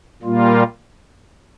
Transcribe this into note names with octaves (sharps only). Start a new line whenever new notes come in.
A#2 G3 A#3 F4